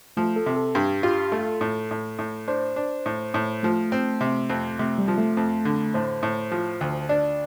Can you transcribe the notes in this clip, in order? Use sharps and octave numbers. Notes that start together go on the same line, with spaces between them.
F3 A3
A4
C3
A4
G2 G4
F4 G4
A3 A4
A2
A2
A2
D4 C5
D4
A2
A2
F3 A3
C4
C3
F2
C3 A3
G3
F3
A3
F2
D3
A2 C5
A2
F3
D2
D4 D5